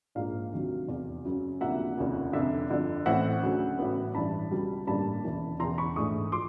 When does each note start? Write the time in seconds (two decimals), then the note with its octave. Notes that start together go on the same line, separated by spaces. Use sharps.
0.15 A#1 G#2 F3 A#3 F5
0.52 D2 C3 D#3 F#3
0.88 F1 E2 B2
1.25 F#2 C#3 F#3
1.61 D2 C3 F3 A#3 E5 F#5
1.98 F1 D#2 C#3 F3
2.33 F1 F2 D3 E5
2.70 G1 F2 D3 F3
3.06 A1 A2 E3 A3 C4 E5 F#5
3.42 D2 C#3 F#3 A3
3.78 A1 A2 F#3 B3
4.15 A1 G2 E3 A5 B5
4.51 C#2 B2 G3
4.87 A1 G2 D3 G3 A#3 A5 B5
5.24 E1 D#2 C#3 E3
5.60 E1 E2 C#3 E3 A#5 C6
5.78 B5 C#6
5.96 A#1 G#2 E3 A3 C#6 D#6
6.32 F3 C6 D6